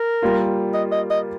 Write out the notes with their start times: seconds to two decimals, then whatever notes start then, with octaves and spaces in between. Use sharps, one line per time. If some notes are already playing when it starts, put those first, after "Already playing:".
Already playing: A#4
0.22 G3 A#3 F4
0.74 D#5
0.92 D#5
1.11 D#5